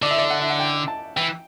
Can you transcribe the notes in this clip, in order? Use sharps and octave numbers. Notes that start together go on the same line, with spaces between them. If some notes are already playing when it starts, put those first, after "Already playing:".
D3 D5
E5
D5
F#5
E5
F#5
G5
A5
E3 G5